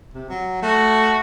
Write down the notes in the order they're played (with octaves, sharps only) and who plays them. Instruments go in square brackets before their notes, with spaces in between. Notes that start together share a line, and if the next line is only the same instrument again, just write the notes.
[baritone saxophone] C3
F#3
[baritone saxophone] A3 [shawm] F#4